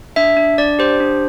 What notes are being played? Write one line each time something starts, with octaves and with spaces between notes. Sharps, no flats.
D4 E5
D4
D4 D5
G4 C5
D4